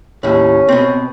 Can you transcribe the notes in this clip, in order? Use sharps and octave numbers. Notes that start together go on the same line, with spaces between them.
D#2 A2 C#4
B2 C4